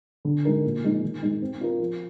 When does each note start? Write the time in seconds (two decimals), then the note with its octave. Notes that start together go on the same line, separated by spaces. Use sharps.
0.25 D3
0.45 G#3 D#4 A#4
0.64 A#2
0.83 F3 G#3 D#4
1.03 D#3
1.22 G#3 D#4
1.42 C4
1.61 F4 A#4
1.79 F3